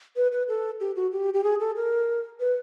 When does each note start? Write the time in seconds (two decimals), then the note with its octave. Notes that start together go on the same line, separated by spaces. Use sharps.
0.16 B4
0.32 B4
0.48 A4
0.80 G4
0.96 F#4
1.12 G4
1.34 G4
1.44 G#4
1.60 A4
1.76 A#4
2.40 B4